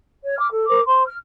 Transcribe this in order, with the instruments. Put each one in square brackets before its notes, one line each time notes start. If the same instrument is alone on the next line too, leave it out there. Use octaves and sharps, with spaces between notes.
[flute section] C#5
D6 F6
A4
A#4 C5 D6
C5 C6
F6